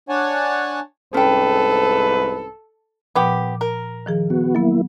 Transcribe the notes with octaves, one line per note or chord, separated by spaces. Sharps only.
D4 C#5 F#5 G#5 A5
C2 G#2 C#4 A4 B4 G5
A#2 F3 B3 G4
A#4
D#3 F3 G#4
B3 F#4
F#3 A#3 B3 E4